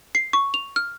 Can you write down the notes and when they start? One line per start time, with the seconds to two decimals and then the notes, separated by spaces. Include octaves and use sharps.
0.15 C7
0.33 C#6
0.54 F7
0.76 F6